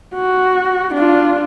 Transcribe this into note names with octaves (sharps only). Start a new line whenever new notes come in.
F#4
D4 F4